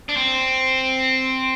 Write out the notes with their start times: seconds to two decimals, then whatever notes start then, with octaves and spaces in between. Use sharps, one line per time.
0.09 D4
0.17 C4